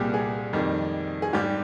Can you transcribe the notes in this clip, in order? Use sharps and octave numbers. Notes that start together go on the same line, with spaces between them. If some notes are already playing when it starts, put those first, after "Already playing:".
Already playing: C2 A#2 G3 G4 G#4
G#4
F2 D#3 G3
G#4
G#2 G3 G4